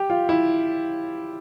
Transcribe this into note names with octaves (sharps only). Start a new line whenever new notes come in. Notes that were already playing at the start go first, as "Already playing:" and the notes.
Already playing: G4
F4
E4